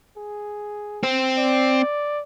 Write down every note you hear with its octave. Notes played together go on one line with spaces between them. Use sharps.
G#4
C4
D5